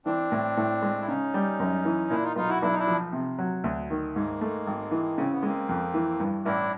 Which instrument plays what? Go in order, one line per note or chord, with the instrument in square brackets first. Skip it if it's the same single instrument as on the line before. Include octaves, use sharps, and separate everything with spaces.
[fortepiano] E3 [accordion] C4 D4
[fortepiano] A2
A2
G#3
[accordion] E4
[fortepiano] C#3 [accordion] C#4 D#4
[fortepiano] G3
F#2
E3
[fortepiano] A#2 [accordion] D4 E4
[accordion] D#4 F4
[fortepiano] B1 [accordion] D#4 F4
[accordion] E4 F#4
[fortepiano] B1 [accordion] D4 E4
[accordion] D#4
D4 E4
[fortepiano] F3
C3
F#3
D2
D#3
[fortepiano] G#2 [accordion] G#3 A#3
[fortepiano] A3
G#1
E3
[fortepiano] C#3 [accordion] C4
[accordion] B3
[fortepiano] G#3 [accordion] A#3 C4
[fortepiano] F2
E3
G2
[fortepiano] A1 [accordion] D4 E4